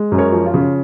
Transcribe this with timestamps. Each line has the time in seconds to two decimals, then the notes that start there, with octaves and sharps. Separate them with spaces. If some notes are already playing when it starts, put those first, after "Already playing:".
Already playing: G#3
0.12 F#2
0.18 A#4 C#5
0.32 F3
0.46 F4
0.54 C#3